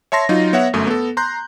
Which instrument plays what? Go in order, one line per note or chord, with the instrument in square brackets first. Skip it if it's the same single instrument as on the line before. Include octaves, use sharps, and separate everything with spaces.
[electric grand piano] C#5 E5 A5 C6 A#6
F#3 D#4 F4
B3 C#5 E5 F#5
G1 F#2 A3 D#6
B3 A4
A#5 C6 F#6 G6